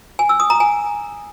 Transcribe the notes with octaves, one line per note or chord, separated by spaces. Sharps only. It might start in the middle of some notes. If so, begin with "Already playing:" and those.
G#5
E6
D#6
A#5
G#5